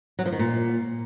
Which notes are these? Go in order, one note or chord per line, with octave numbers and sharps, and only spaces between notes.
F#3
F3
D#3
A#2